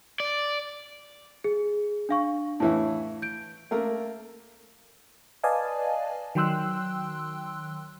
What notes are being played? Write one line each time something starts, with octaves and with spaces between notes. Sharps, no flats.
D5
G#4
D4 F5 C#6
A2 E3 E4
G6 D7
A3 A#3 A#4
B4 D5 D#5 F5 G#5 A5
D#3 F#3 G5 C6 E6 F#6